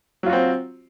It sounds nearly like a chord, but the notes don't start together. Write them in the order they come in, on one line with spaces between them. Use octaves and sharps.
F#3 F4 F#4 C4